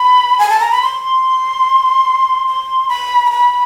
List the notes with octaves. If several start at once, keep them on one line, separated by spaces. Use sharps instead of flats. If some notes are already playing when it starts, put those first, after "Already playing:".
Already playing: B5
G#5
A5
A#5
B5
C6
C6
B5
A#5
B5